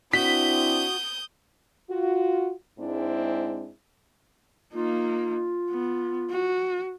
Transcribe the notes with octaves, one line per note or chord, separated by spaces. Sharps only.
C4 D4 E4 F#4 D#6 G6 B6
F4 F#4
G#2 G#3 C4 D4 E4
A#3 D#4 F4
B3
F#4